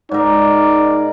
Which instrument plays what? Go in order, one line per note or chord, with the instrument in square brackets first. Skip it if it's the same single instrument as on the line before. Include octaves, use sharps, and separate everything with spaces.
[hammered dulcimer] G#2 A#4 [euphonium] D#4 [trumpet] D5